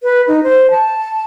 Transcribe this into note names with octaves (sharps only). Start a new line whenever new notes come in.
B4
D#4
C5
A5